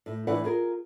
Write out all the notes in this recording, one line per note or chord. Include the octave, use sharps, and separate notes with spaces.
A2
A2 E3 D4 B4 F#5
F4 G#4 A#4